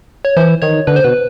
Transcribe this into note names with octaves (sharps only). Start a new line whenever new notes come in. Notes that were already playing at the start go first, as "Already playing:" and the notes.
C#5
E3 C5
D#3 C#5
D3 B4
C5
B2 B4